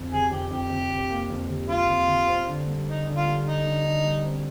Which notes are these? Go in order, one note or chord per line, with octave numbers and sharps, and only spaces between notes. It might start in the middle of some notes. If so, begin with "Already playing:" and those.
Already playing: F2
C3 G#4
F2 G4
F2 G4
C3
C3
A#3
F2
C3
F3 F4
C3
C3
C4
D3
G3
D3 D#4
D3
F4
G3
D3 D#4
D3
D3
G3
C4